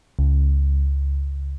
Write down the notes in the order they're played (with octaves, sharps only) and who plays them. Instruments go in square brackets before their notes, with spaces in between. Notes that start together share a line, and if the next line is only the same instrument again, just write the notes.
[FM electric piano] C#2